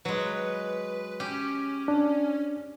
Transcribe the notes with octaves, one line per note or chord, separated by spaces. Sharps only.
F#3 G#3 B4
C#4 G4
D4